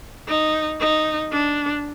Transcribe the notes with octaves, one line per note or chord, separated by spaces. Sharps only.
D#4
D#4
D4